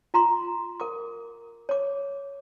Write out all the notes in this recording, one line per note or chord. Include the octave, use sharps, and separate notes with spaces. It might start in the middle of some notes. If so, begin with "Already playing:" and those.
F4 A#5 C6
A#4 D6
C#5 D6